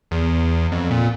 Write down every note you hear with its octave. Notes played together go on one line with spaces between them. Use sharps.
E2
F2
A#2